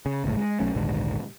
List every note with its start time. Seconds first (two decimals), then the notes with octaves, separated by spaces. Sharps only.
0.06 C#3
0.24 G1 C#2 A2
0.37 G#3
0.60 B1 F#3 A3 C#4
0.75 A#1 D#2 G#2 D3